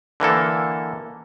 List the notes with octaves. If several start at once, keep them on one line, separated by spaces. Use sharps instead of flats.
D3 E3 A#3 A4